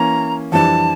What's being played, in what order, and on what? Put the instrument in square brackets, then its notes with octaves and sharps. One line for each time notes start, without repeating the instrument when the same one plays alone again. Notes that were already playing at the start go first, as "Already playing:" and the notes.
Already playing: [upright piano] E3 A#3 C#4 [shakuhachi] A#5
[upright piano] F2 E3 G3 D4 [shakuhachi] A5